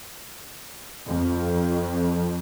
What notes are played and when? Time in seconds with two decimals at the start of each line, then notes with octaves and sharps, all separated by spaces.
1.07 F2